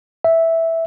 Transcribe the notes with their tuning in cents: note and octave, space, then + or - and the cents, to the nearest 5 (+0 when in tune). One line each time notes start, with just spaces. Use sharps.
E5 -5